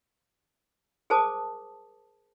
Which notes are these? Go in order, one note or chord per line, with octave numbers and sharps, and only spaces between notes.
G#4 A#4 C5 A5 D6 D#6